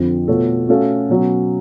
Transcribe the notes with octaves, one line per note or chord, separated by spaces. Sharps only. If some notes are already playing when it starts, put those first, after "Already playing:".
Already playing: F2 D3 F3
B2 A3 F4 A4 C#5
A3 C#4 F#4 A4 F5
B2 F#3 C#4